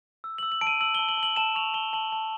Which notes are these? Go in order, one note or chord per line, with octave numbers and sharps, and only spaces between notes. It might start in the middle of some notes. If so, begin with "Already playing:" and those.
E6
E6 F#7
F#7
A5 D7
D#7
E6 F#7
A5 G7
F#7
A5
F#7
A5 E7
C#6 F7
A5 G7
A5 F#7
A5